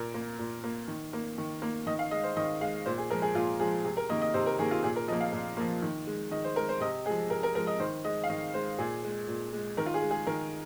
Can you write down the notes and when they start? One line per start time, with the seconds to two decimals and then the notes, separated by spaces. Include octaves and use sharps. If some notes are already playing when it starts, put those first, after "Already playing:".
Already playing: A#2 A#4
0.14 A#3
0.39 A#2
0.64 A#3
0.88 D#3
1.13 A#3
1.38 D#3
1.62 A#3
1.86 D#3 D#5
1.99 F5
2.11 G#3 D#5
2.23 C5
2.36 D#3 D#5
2.61 G#3 F5
2.86 A#2 C5
2.98 G#4
3.10 F3 G#3 A#4
3.22 G#4
3.35 A#2 F4
3.60 F3 G#3 G#4
3.84 C3 G#4
3.97 A#4
4.09 D#3 A#3 D#5
4.21 D#5
4.34 C3 C5
4.46 A#4
4.59 D#3 A#3 G#4
4.71 F4
4.83 A#2 G#4
4.96 A#4
5.08 F3 D#5
5.12 A#3
5.21 F5
5.33 A#2
5.57 F3 A#3
5.82 D#3
6.07 G#3
6.31 D#3 D#5
6.44 C5
6.56 G#3 A#4
6.69 C5
6.80 C3 D#5
7.06 G#3 G#4
7.09 F3
7.30 C3 A#4
7.43 A#4
7.55 F3 G#3 A#4
7.67 D#5
7.79 D#3 C5
8.04 G#3 D#5
8.24 F5
8.29 D#3 D#5
8.54 G#3 C5
8.78 A#2 G#4
9.04 G#3
9.28 A#2
9.53 G#3
9.77 D#3 A#4
9.86 F4
9.94 G#4
10.02 G#3
10.11 G#4
10.27 D#3 A#4